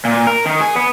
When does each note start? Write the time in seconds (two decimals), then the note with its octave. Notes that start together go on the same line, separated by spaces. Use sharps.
0.05 A#2
0.27 A#4
0.46 D#3
0.60 G#4
0.75 B3